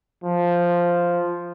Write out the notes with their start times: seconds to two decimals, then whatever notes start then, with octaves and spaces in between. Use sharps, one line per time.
0.24 F3